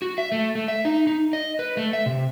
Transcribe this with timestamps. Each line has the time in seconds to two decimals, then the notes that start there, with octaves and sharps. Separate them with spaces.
0.02 F#4
0.18 E5
0.32 A3
0.55 A3
0.68 E5
0.85 D#4
1.07 D#4
1.33 D#5
1.59 B4
1.77 A3
1.93 E5
2.06 C3